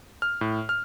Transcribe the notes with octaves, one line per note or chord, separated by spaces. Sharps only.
F6
A2
F6